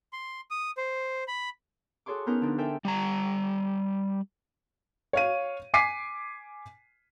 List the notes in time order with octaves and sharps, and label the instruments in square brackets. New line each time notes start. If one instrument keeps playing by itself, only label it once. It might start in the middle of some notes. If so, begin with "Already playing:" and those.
[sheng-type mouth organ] C6
D#6
C5
B5
[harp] F#4 G#4 A4 C#5 C6 D6
B3 C#4 D#4 A#4 C5
D3 F3 D4 D#4
A4 A#4 C5 E5 G5 G#5
[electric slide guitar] G3 D5 A#5
[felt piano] C#5 F5 D#7
G#5 D6 B6 C7 D#7